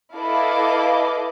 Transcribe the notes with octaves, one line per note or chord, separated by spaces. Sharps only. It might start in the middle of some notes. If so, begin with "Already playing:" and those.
E4 A4 B4 D#5 F5 D6